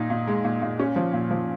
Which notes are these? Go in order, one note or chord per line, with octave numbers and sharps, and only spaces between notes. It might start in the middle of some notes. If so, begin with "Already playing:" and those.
Already playing: A#2 D#4
A#2
G#3
A#2
A#2
C#4
F3
A#2
F3